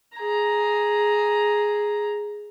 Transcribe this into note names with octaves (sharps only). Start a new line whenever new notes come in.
G#4 A#5